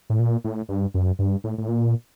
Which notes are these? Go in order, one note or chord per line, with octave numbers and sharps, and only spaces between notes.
A2
A#2
A2
G2
F#2
G2
A2
A2
A#2